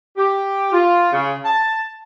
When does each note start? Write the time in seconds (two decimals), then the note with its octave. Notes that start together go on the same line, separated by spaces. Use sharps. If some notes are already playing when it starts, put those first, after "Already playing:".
0.17 G4
0.72 F4
1.12 C#3
1.45 A5